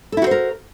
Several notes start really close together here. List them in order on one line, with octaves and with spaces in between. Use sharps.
A4 E4 F#4 C5 A#4